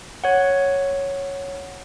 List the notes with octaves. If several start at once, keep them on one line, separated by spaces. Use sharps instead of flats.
C#5 F#5